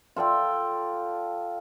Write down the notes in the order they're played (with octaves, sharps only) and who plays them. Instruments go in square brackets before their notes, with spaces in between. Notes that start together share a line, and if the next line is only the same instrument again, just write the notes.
[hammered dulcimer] F4 A4 D5 G5